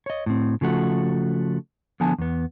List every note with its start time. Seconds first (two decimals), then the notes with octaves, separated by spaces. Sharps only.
0.06 C#5 D#5
0.26 A2 C4
0.61 C#3 F3 A3 F#4
2.00 D3 F3 B3 G#5 A5
2.18 E2 B3